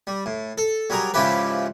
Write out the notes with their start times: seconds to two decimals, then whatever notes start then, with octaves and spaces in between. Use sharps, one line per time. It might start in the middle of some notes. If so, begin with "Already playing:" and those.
0.07 G3
0.26 A2
0.58 A4
0.90 F#3 G3 G#4 A#4 A#5
1.14 G#2 C#3 F3 E4 G4 B4